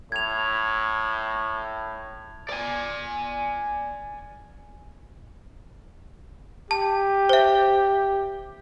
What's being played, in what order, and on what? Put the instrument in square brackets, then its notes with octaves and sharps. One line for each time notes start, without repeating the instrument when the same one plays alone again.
[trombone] A2 [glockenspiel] G#6 F7
[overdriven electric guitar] D5 G#5
[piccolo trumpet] G4 [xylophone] A5
[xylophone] C5 E5